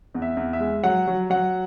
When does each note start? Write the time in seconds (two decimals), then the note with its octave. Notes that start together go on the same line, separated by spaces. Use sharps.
0.15 E2
0.22 E5
0.37 E2
0.53 E5
0.60 G#3
0.84 F#3 F#5
1.08 F#3
1.30 F#3 F#5